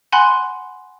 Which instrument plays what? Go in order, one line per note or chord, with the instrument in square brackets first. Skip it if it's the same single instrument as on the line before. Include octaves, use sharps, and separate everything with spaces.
[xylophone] F#5 G#5 B5 C6 F#6